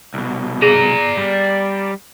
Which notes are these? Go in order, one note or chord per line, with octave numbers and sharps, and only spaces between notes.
C2 B2
G#4 D5 A#5
G3